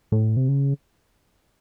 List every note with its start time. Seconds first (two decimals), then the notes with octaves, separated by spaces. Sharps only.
0.12 A2
0.37 C3
0.48 C#3